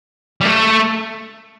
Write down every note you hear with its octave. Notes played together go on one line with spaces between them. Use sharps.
G3
A3